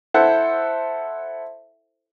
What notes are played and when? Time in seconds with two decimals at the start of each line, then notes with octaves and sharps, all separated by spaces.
0.14 E4 A4 C5 F#5